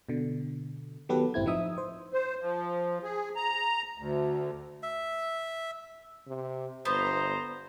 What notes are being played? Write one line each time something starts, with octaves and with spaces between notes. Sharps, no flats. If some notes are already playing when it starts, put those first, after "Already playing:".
B2 D3
D#3 F#3 B3 G4 A4 B4
G1 A2 C4 E4 G#6
F3 D#4 E5 D#6
C5
C5
F3
G#4
A#5
D2
E5
C3
G1 B3 C5 A#5